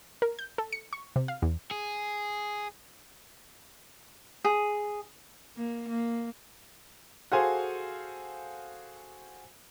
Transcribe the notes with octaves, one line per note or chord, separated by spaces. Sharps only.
A#4
G6
A4
C#7
C#6
C3
F5
E2
G#4
G#4
A#3
A#3
F#4 G#4 A4 C5 F5 G#5